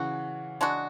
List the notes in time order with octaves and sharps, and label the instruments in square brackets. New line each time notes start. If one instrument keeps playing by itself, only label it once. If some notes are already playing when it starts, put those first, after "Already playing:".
Already playing: [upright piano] C#3 E3 [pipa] F#4
[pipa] G#3 D4 F#4